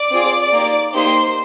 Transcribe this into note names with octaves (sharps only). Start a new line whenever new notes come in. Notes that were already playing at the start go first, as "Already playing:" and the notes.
Already playing: D5 D6
C4 F4 G#4
A#3 D#4 G4
A#3 D#4 G4 C5 C6